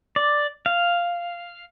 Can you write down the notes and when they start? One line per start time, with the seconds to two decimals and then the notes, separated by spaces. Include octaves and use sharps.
0.16 D5
0.66 F5